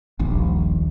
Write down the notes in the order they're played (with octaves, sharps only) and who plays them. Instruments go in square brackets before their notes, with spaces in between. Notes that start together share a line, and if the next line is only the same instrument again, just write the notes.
[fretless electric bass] D#1 A#1 D#2